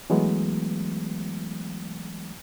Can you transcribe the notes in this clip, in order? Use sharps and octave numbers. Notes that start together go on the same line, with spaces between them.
E3 F#3 G#3 A3 B3